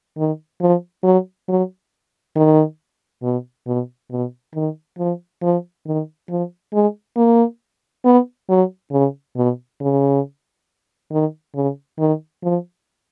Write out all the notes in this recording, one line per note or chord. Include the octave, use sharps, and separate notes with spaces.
D#3
F3
F#3
F#3
D#3
B2
B2
B2
D#3
F3
F3
D#3
F3
G#3
A#3
B3
F#3
C#3
B2
C#3
D#3
C#3
D#3
F3